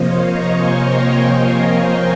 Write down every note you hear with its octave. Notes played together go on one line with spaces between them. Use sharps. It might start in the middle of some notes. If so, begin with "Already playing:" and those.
Already playing: C3 F3 A#3 C5 C#5 D#5 F5
A#5 C#6
G#5 C6
G5 A#5
G5 A#5